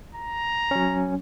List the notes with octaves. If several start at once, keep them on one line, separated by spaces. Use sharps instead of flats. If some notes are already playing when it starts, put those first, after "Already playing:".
A#5
F#3 C#4